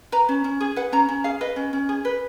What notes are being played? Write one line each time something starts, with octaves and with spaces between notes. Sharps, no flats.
B4 A#5
C#4
C#4
G#4
B4 F#5
C#4 A#5
C#4
G#4 F5
B4 D#5
C#4
C#4
G#4
B4